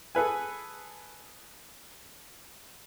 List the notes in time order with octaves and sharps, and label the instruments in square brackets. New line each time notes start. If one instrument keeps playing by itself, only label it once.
[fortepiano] G#4 A4 B4 G#5